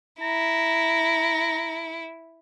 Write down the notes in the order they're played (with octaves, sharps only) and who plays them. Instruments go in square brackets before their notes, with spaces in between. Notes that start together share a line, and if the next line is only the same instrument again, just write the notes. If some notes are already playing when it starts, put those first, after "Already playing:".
[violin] E4 [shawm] A#5